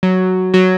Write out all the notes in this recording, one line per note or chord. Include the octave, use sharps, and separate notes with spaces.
F#3
F#3